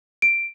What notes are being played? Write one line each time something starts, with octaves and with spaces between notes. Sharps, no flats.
D7